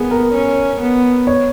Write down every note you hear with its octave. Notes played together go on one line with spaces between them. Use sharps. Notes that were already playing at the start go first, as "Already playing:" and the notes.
Already playing: B3 G#4 A#4
A#4
C#4
B3
C#5